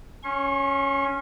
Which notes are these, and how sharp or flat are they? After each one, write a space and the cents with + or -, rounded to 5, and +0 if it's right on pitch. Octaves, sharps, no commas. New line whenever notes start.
C#4 +0 C#6 -40